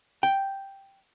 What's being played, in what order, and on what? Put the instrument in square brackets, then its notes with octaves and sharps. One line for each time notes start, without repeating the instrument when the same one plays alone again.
[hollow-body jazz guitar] G5